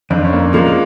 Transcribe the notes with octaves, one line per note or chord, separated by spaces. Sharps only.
F2 C4 D4
C#4
A#3 C4
F3 G#3 A#3